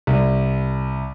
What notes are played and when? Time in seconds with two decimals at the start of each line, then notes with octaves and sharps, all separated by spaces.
0.07 C2